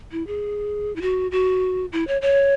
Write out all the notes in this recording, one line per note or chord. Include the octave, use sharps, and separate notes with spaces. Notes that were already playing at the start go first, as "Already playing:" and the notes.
E4
G#4
E4
F#4
F#4
E4
C#5
C#5